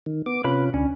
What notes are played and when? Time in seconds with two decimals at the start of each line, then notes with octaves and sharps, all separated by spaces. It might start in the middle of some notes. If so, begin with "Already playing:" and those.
0.06 D#3
0.26 B3 D6
0.44 C3 C#4 F4 B4 B5
0.74 D2 C#4 D4